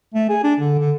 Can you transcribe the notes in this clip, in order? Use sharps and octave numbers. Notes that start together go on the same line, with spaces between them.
A3
G#4
D4
D3
D3